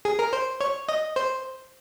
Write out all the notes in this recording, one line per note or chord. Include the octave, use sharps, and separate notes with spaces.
G#4
A#4
C5
C#5
D#5
C5